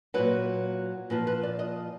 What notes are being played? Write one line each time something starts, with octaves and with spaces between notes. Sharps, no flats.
A#2 F#3 B4
A#2 F3 B4
B4
D5
D#5